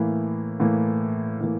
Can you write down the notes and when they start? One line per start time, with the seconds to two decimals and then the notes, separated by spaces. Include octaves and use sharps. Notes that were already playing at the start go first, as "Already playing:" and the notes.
Already playing: A2 E3 A#3
0.60 A2 E3 A#3
1.41 A2 E3 A#3